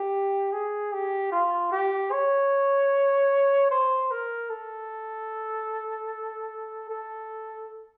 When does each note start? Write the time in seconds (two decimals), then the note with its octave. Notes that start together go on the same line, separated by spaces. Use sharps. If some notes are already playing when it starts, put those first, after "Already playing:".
Already playing: G4
0.53 G#4
0.93 G4
1.32 F4
1.72 G4
2.12 C#5
3.71 C5
4.11 A#4
4.50 A4
6.90 A4